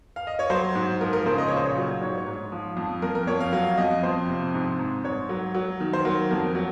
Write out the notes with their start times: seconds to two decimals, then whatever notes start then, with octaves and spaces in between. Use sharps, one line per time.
0.16 F5
0.27 D#5
0.39 C#5
0.50 F#3 C5
0.75 G#2
1.01 F3 A#4
1.13 A#4
1.26 C#3 C5
1.38 D#5
1.48 A#2 C#5
1.57 C5
1.65 C#5
1.77 F#3
2.01 G#2 C#5
2.18 C#5
2.27 G#2
2.52 F3
2.77 F2
3.02 F2 A#4
3.15 A#4
3.27 F2 C#5
3.40 F5
3.53 F#3 F5
3.77 F2 D#5
4.03 F2 C5
4.29 C3
4.54 G#2
4.79 G#2
5.04 G#2 C#5
5.29 F#3
5.55 F#3
5.80 D#3
5.93 C5
6.05 F#3 A#4
6.31 F2 A#4
6.55 F#3